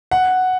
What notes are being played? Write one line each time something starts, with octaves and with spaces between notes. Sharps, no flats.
F#5